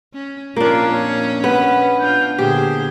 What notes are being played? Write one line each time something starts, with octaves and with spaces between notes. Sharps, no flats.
C#4
F2 A#2 A#3 C#4 D4 F4
C#5
B3 B4
D4 F4 G6
A#2 D3 G4 G#4 C5